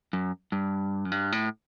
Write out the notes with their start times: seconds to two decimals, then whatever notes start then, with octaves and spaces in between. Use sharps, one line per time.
0.13 F#2
0.52 G2
1.05 F#2
1.12 G2
1.32 A2